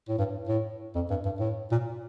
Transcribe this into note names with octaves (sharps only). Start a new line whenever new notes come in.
A2
G2
A2
F2
G2
G2
A2
A#2